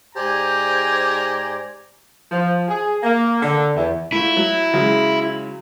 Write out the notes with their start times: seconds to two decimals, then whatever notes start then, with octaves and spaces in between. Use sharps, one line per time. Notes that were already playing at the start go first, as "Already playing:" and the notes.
0.15 G#2 G4 C5 D5 G#5 A#5
2.31 F3
2.68 G#4
3.03 A#3
3.43 D3
3.76 E2
4.12 A3 E4 F4
4.37 F#3
4.73 C#3 F#3 G#3